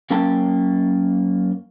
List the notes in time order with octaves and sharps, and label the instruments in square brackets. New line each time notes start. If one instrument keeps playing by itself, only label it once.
[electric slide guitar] F#2 A#3 C#4 G5 A5